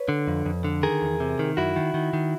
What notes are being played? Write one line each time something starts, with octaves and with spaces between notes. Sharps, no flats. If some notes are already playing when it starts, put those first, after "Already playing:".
Already playing: B4 C#5
D3
F2
F2
D3
D#3 G#4 A#4
E2
C3
D#3
F#2 E4 F#4
D#3
D#3
D#3